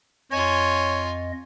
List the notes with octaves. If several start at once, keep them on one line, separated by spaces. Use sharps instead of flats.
F2 F4 C#5 D#5 G#5